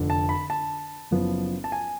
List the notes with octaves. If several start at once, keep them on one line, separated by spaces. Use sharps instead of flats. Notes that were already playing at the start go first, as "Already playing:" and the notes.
Already playing: F1 F2 D3
A5
B5
A5
F#1 F#2 F3 B3
A5
G#5